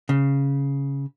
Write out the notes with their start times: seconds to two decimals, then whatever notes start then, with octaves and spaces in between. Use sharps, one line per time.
0.09 C#3